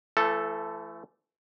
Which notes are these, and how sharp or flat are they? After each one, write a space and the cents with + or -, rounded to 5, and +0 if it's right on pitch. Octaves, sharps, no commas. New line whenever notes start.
E3 +35 A3 +0 A4 +0